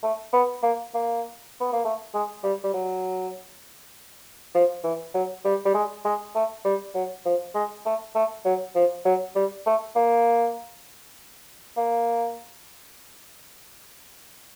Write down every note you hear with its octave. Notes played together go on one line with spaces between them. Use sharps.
A3
B3
A#3
A#3
B3
A#3
A3
G#3
G3
G3
F#3
F3
E3
F#3
G3
G3
G#3
G#3
A3
G3
F#3
F3
G#3
A3
A3
F#3
F3
F#3
G3
A3
A#3
A#3